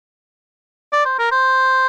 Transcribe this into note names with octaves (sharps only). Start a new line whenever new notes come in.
D5
C5
A#4
C5